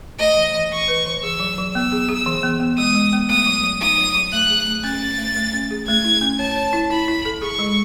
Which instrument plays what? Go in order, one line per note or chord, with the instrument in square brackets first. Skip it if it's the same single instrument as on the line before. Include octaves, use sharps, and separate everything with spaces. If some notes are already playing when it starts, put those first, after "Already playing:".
[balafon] A3 [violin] D#5
[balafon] E3
E3
[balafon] E3 [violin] C#6
[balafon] B4
E3
[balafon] G#4 [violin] E6
[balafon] F#3
F#3
[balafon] B3 [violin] E6
[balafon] G#4
G#4
E3
B3
B3
[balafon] G#3 [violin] D#6
[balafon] G#3
B3
[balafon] A3 [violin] D#6
[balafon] F#3
F#3
[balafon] D#4 [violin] D#6
[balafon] F#3
F#3
[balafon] A3 [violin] F#6
[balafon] G#4
A3
[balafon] C#4 [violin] A6
[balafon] C#4
A3
A3
C#4
G#4
[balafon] A3 [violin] G#6
[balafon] E4
C#4
[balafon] C#5 [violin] A5
[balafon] C#5
E4
[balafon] E4 [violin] B5
[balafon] E4
A4
[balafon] G#4 [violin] C#6
[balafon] G#3